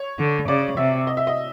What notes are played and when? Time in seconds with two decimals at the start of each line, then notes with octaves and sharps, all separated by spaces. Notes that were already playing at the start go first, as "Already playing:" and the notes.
Already playing: C#5
0.19 D3
0.48 C#3 D5
0.77 C3 E5
1.07 D#5
1.17 E5
1.27 D#5